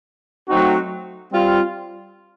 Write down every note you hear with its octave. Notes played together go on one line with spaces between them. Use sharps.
F#3 A3 C4 D#4 F#4
G3 C4 F4